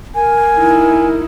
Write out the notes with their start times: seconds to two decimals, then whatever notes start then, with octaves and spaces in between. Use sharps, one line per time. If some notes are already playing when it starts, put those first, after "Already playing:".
0.15 A#4 G#5
0.58 D#4 E4